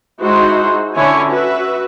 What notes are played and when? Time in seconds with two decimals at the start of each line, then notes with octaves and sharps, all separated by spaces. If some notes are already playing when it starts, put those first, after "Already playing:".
0.21 G#3 D#4 E4 F#4 C5
0.95 D3 C#4 E4 C#5 G#5
1.31 F#4 B4 E5